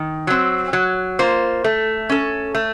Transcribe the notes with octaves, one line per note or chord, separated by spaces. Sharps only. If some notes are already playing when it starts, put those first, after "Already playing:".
Already playing: D#3
F#3 C4
F#3
A#3 F4 C5
A3
C#4 A4
A3